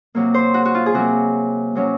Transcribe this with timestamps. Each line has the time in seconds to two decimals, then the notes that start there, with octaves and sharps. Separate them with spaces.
0.15 C3 F#3 A#3
0.34 C5
0.54 F#4
0.65 F#4
0.75 F4
0.86 G#4
0.94 C3 F#3 A#3 F#4
1.75 C3 F#3 C#4